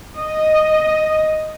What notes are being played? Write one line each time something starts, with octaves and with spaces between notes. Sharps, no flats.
D#5